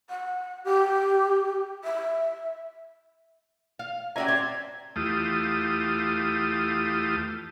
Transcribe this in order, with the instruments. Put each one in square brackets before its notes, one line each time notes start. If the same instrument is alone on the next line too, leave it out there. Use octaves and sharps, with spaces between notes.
[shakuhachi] F#5
G4
E5
[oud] F5
[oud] C#4 F#4 G4 [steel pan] D5 E5 A#5 [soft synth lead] G#6
[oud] C4 [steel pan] D5
[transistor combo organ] E2 A3 F4 G4 D#6